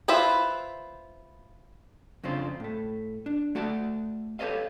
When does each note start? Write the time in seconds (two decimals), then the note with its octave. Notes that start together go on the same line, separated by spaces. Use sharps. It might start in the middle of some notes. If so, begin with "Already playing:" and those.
0.08 E4 F4 B4 C5 E5
2.24 F2 C#3 F3 C4 D4 F4
2.60 A2 A3
3.26 D4
3.55 A3 F#4 D5 A5
4.39 G4 A4 B4 C#5 D#5 F5